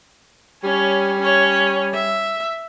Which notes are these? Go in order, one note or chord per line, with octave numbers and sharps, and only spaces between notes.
G3 C#4 C#5
C#4 C#5
E5